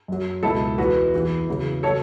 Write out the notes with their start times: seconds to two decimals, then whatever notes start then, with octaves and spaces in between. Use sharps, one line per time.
0.08 F#2 F#3
0.43 C#2 B2 F#3 E4 A4
0.78 E2 E3 F#4 B4
1.14 E2 E3
1.48 E2 C#3 F#3
1.83 C#3 F#3 A4 C#5